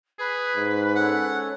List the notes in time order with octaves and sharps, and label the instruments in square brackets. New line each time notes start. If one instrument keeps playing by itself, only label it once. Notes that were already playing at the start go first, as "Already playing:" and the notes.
[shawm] G#4 [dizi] B4
[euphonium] G#2
[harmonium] C#4 A4 C#5 [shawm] F#5